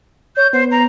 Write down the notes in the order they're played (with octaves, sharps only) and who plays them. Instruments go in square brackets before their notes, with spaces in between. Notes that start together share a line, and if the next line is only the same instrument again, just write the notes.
[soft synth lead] C#5 [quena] G6
[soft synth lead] B3 [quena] C5
[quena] A#5